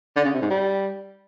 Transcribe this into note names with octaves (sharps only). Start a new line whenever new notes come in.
D3
C#3
C3
G#2
G3